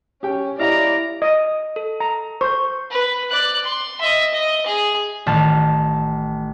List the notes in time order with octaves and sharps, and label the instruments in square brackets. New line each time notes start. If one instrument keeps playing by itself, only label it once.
[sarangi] C#4 [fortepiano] G4 G5
[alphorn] E4 [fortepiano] G4 D#5 F5 [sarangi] D5 [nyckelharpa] A#5
[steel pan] D#5
[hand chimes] A4
[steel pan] A#5
[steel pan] C5 [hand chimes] C#6
[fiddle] B4
D5 F#6
C6
D#5 E5
D#5
G#4
[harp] A1 D#3 A5 F6